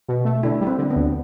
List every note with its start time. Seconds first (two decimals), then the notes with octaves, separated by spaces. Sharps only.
0.08 B2
0.25 A3
0.43 D3 E4
0.61 G3
0.67 C4
0.78 D3
0.90 B3
0.96 D2